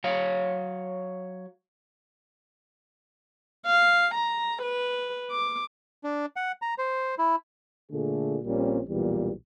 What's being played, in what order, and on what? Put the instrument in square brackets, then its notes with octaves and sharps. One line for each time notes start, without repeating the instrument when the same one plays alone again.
[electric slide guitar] F#3 C#5 F5
[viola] F5
A#5
B4
D6
[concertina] D4
F#5
A#5
C5
E4
[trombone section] A#2 D3 A3 G#4
A#1 A#2 G3 C4 C#4
B1 E2 A#2 E3 G3